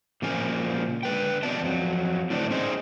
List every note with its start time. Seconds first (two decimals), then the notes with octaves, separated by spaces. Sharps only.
0.22 A#2 C#3 F3 A#3 G#5
1.03 D3 B4 G5
1.43 B2 F3 C4 D5 G5 A5
1.61 F2 F#3
2.30 A2 D3 C4 D4
2.50 C#4 D#4 G#4 C5